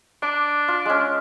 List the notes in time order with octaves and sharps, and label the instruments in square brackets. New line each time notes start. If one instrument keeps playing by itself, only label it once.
[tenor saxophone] D4 [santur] D6
[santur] F4
G#3 C#4